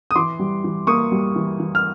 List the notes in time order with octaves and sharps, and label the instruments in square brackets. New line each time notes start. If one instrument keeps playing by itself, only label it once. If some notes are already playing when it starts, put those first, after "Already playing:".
[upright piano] D#6
E3 C6 D6
G3
E3
A#3 C#6 D#6
G3
E3
E3
F6